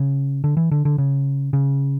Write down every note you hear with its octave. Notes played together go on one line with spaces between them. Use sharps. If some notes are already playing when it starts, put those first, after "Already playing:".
Already playing: C#3
D3
E3
D3
D3
C#3
C#3